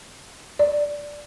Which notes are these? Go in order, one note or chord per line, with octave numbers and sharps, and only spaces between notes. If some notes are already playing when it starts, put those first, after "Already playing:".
D5